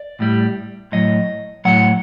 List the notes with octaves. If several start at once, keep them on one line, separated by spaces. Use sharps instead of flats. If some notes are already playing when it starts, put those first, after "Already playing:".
Already playing: D5
A2 G3
A2 F#3 D#5
A2 F#3 F#5